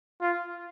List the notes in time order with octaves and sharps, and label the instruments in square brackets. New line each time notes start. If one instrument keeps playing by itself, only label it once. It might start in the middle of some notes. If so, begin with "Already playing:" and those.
[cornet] F4